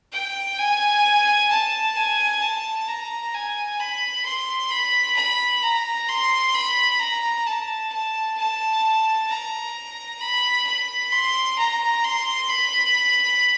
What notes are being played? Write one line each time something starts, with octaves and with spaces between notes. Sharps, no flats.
G5
G#5
A5
G#5
A5
A#5
G#5
B5
C6
B5
B5
A#5
C6
B5
A#5
A5
A5
A5
A#5
B5
B5
C6
A#5
C6
B5